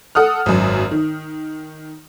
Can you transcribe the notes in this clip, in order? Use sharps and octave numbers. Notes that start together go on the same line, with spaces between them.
A4 F#5 D#6 F6
G#1 F#2
D#3